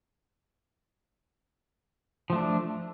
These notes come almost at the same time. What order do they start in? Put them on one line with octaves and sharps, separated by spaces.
F3 A3 D4